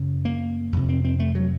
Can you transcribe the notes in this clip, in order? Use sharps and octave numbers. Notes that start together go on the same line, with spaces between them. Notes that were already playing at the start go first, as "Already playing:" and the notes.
Already playing: F#2 C#3
A#3
F2 C3
C4
C4
A3
F#3